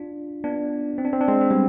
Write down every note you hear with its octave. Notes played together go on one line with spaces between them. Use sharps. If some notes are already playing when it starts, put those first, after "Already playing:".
Already playing: D4 F4
B3 D4
C4
D4
C4
D4
G#3 C4
C4
G3 B3